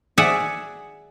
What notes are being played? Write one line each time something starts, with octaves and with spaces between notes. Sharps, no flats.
G#4 D5 E5 F#5 G#5